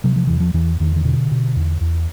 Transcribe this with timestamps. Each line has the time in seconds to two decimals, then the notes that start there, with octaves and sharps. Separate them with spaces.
0.04 C3 F#3
0.16 F3
0.27 E2 E3
0.40 F3
0.54 E2 E3
0.80 E2 D#3
0.96 D#3
1.05 B2 D3
1.31 B2
1.56 E2
1.81 E2